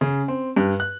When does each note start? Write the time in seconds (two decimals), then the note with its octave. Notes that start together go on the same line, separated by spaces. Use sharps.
0.01 C#3
0.28 C4
0.56 G2
0.80 F#6